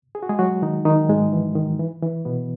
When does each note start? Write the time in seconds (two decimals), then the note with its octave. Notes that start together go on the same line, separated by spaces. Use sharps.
0.15 G#4
0.23 F#4
0.29 G#3 G#4
0.39 F#3 F#4
0.62 D#3 D#4
0.85 D#3 D#4
1.09 G#2 G#3
1.32 E3
1.55 D#3
1.79 E3
2.02 E3
2.25 B2 B3